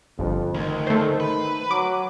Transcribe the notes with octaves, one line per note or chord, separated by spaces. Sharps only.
G1 F2
D2 D#3
A3 C5
B4
F#3 D6